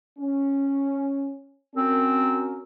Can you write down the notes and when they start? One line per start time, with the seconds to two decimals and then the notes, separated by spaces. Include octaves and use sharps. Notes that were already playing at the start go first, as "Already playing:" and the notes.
0.18 C#4
1.76 C4 C#4 F#4 A#4